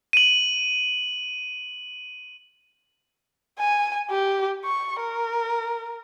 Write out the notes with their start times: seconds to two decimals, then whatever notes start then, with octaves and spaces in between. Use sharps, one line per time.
0.13 D#7 F#7
3.59 G#5
4.10 G4
4.65 C#6
5.00 A#4